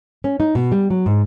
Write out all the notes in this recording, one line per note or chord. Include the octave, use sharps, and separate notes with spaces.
C#4
D#4
B2
G3
F#3
G#2